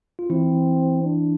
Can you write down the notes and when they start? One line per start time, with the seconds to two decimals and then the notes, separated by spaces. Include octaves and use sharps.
0.19 F4
0.29 E3 C4 E4
1.03 D4